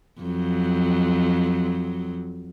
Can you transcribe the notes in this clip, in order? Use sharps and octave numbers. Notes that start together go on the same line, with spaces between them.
F2 F#3